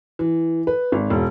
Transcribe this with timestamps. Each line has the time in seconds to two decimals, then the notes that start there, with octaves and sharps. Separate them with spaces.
0.19 E3
0.67 B4
0.92 G#1
1.10 E1